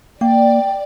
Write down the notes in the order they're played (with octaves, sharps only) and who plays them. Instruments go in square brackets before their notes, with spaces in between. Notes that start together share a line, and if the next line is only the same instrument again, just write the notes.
[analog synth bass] A#3 [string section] D5 [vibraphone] G5